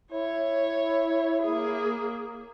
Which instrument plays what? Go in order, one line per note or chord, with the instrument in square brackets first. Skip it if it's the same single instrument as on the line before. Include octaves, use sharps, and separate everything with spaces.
[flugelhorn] E4 [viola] C#5
[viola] A#3 G#4